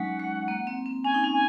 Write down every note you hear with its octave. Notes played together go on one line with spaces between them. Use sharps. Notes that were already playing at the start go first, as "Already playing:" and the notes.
Already playing: F#3 G#3 C#4 D#4 F#5
G#3
A#3
C4
C4
C#4 G#5
D#4
C#4
G#5